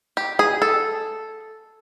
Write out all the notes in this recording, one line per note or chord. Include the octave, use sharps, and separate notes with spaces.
G4
G#4
A4